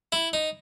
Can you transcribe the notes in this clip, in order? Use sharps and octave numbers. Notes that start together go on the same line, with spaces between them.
E4
D#4